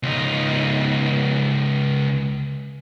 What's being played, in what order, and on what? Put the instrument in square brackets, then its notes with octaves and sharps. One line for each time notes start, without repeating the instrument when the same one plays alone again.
[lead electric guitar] C#2 D#4